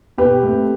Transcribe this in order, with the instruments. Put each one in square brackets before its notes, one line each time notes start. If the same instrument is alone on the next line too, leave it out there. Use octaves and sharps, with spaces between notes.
[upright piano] B2 G4 B4
A3 C4